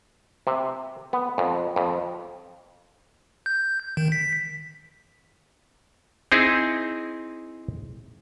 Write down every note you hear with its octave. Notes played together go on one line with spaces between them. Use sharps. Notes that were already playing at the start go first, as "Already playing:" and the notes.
C3
B3
F2
F2
G6
D#3
B6
C4 D#4 E4 G#4